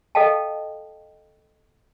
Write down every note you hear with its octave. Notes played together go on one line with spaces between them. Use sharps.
A4 D#5 F5 G5 A5